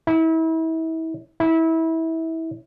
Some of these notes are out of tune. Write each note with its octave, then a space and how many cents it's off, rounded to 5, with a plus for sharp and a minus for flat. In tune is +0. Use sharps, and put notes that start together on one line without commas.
E4 -35
E4 -25